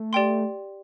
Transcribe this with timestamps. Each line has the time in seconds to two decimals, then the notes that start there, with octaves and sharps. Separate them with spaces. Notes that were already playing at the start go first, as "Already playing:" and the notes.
Already playing: A3
0.13 G4 D5 G5 C6